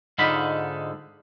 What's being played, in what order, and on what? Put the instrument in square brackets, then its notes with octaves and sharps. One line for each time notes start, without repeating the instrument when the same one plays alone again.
[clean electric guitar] G#2 D3 D#4 F4 B5